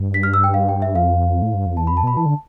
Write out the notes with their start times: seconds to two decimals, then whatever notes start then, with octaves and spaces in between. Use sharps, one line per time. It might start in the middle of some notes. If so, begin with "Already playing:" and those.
Already playing: G2
0.14 B6
0.23 F6
0.34 E6
0.44 G5
0.54 F5
0.69 G5
0.82 E5
0.95 F2 F5
1.42 A2
1.54 G2
1.66 F2
1.76 E2 A5
1.87 F2 B5
1.97 A5
2.03 B2 B5
2.17 E3 A5
2.26 D3